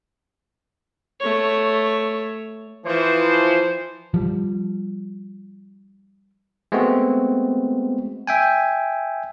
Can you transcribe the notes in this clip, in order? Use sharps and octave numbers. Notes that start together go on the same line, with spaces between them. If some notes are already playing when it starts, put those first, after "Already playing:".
A3 C#5
E3 F3 C5
F3 G3
G#3 A3 B3 C4 F#4
E5 G5 G#5